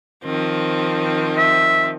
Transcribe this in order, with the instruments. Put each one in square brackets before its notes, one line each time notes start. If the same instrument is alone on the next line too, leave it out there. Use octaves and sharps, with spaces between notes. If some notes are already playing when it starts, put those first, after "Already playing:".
[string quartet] D#3 F3 C4
[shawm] E5